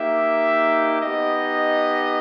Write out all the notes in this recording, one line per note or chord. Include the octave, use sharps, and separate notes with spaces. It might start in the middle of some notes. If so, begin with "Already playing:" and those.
Already playing: A#3 D#4 G4 E5
B3 D#4 G4 D#5